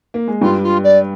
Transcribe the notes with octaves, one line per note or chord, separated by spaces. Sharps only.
A#3
G#3
G2 G3 F4
F4
D5